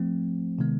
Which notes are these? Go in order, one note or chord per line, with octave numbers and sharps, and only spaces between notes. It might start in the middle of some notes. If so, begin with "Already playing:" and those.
Already playing: F3 A3 C4
C3 D#3 G#3 B3